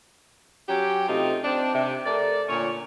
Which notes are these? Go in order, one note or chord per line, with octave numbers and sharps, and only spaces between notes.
F#3 C#4 G4
C3 A3 C4 D#4 F4
C4 D4
C3
A3 A#4 D5
A#2 D3 C#4 C#5